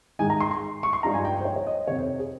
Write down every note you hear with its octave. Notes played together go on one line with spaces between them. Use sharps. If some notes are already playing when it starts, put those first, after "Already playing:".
G#2 D#3 G#3 D#4 G#5
A#5
C6
C6
C#6
C6
G2 F3 G#3 D#4 A#5
G#5
G5
C5
C#5
C#5
D#5
F2 C3 D#3 C#5
C5
G#4